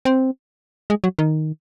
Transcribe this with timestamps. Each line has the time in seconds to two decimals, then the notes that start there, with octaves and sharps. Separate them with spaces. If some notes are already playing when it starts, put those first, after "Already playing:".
0.05 C4
0.90 G#3
1.04 F#3
1.19 D#3